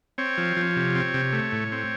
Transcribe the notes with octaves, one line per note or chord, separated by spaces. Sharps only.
C4 C#5
F3
F3
C3
C4
C3
A3
A2
C4